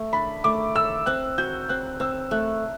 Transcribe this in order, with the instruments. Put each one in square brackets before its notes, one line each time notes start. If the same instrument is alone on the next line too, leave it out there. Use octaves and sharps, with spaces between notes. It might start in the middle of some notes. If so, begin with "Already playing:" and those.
Already playing: [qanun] A3
[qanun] D4 [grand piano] B5
[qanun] A3 [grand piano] D6
[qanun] A4 [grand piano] E6
[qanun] C4 [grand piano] F#6
[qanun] F#4 [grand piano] G6
[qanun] C4 [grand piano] F#6
[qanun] C4 [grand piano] E6
[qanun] A3 [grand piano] F#6